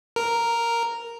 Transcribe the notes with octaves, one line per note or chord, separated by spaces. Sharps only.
A#4